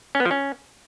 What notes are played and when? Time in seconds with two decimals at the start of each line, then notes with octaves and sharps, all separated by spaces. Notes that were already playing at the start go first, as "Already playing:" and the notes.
0.15 C#4
0.20 B3
0.25 F3
0.31 C#4